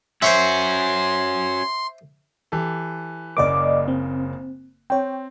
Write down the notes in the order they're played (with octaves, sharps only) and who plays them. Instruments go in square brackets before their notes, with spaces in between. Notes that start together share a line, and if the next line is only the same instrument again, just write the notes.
[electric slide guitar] C#4 F#4 [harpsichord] C5 C#5 E5 [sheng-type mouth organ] C6
[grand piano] E3 G4 A4
[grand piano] F#1 C#3 A#3 [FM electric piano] D5 D#5 D6
[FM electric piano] C4
[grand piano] C4 [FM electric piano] C#5 G5